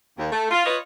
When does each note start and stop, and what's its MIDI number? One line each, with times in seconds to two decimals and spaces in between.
0.18 0.32 39
0.32 0.46 57
0.51 0.65 65
0.66 0.77 65
0.66 0.77 71
0.66 0.77 73
0.66 0.77 75